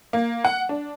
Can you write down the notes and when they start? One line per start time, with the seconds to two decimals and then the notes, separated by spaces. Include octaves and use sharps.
0.13 A#3
0.45 F#5
0.69 D4